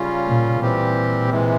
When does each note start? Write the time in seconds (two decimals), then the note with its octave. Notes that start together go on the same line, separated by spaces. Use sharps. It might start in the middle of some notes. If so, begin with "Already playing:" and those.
Already playing: C#3 G3 C#4 F4
0.26 A#2
0.59 A#2 E3 G3 C4 G4
1.29 C3 E3 G#3